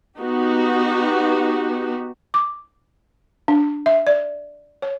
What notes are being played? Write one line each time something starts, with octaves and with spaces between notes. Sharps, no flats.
B3 D#4 F#4 G4
D6
D4
E5
D5
C#5